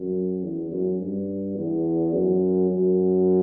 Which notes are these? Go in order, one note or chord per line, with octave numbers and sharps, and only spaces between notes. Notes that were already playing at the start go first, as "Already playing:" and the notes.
Already playing: F#2
E2
F#2
G2
E2
F#2
F#2